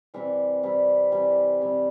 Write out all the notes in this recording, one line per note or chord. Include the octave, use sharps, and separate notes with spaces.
C3 E3 G3
C3 E3 G3
C3 E3 G3
C3 E3 G3